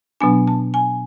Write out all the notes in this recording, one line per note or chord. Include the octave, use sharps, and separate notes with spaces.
B2 F#3 B3 D4 G#5
A5
G#5